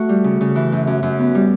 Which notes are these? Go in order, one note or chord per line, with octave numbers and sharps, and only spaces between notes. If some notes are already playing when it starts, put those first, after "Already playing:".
Already playing: A3 F#4
G3
C#3
C#3
E3
F#2
F#2
F#2
B3
G3